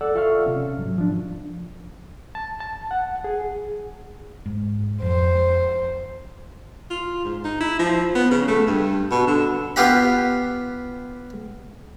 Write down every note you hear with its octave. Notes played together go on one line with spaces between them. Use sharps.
A4 D5 F#5 E6
F4 A4 E5 F5 C#6 F6
C3 C#4
G#2 F#3
F3 D4
A5
A5
F#5
G#4
G#2
F2 C5
F4
G#2
D#4
E4
F3
B3
C#3
A3
G2
B2
D3
B3 F4 G4 F#5 B5